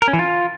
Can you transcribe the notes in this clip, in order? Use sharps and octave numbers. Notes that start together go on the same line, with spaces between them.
A#4
C#4
E3
F4